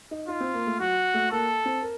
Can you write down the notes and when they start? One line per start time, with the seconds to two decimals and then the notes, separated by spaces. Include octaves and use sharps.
0.11 D#4
0.28 D#4 F4
0.41 C4
0.54 A#3
0.67 A3
0.80 F#3 F#4
1.14 A3
1.31 A#3 A4
1.65 C4
1.82 A#4